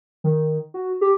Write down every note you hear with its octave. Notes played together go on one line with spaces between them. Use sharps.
D#3
F#4
G4